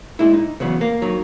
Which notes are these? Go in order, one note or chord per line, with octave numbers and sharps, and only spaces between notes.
A#2 G#3 E4
D#4
E2 C#3 F#3 B3
A#3
D#3 F#3